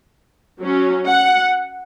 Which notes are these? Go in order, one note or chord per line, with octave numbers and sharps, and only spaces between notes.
F#3 C#4
F#5